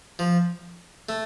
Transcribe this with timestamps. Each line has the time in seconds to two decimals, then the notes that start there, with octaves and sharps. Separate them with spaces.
0.19 F3
1.09 A3